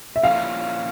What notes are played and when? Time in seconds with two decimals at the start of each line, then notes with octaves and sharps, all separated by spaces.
0.16 E5
0.23 A#2 F3 C#4 E4 F5